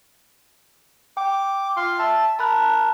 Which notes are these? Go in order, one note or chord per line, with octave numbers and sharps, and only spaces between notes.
G5 D6
F4 F5 C6
E5 A5
A#4 A5 B5 F#6